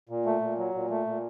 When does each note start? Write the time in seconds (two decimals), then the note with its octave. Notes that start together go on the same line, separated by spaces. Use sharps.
0.09 A#2
0.26 A3
0.41 A#2
0.58 F#3
0.74 A#2
0.90 A3
1.07 A#2